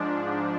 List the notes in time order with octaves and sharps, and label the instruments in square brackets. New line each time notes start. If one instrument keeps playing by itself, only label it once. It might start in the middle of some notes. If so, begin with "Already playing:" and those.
Already playing: [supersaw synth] G#2 F3 D4